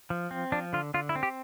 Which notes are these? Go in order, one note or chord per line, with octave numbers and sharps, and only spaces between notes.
F3
C4
F3 D4
D3 F4
D3 F4
E4
C4
G4